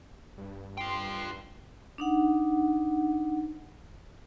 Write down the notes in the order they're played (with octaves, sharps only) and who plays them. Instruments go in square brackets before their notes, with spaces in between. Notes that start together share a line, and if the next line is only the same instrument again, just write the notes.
[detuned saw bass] G2
[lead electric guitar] F4 G5 [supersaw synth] C6
[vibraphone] D4 D#4 F#5